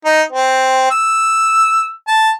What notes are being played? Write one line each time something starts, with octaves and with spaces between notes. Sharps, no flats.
D#4
C4
E6
A5